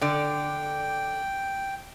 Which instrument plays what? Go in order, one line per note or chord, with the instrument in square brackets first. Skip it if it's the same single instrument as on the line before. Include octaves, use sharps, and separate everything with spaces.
[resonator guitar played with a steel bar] D3 D5 [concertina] G5